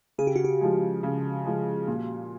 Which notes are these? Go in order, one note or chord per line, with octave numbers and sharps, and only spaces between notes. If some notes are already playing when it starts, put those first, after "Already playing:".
C#3 G#4
G4
F#4
G4
F3 G#3
C#3
F3 G#3
A#2